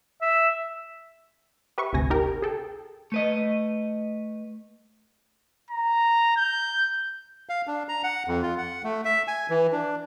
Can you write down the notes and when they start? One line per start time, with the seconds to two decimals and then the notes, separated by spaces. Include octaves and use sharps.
0.21 E5
1.78 G4 B4 E5 C#6
1.93 G#1 D2 C3 G#5 A#6
2.10 D#4 G4 A#4 G5
2.42 G#4 A4 G5
3.12 A3 B4 D#5
5.70 A#5
6.37 G6
7.49 F5
7.67 D4
7.89 A#5
8.04 F#5
8.28 F2
8.43 F4
8.58 F#5
8.84 A3
9.05 E5
9.28 G#5
9.50 E3
9.73 D4